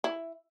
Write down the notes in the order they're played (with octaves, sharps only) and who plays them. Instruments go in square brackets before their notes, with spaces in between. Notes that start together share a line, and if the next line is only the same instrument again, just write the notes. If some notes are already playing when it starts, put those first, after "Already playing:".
[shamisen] E4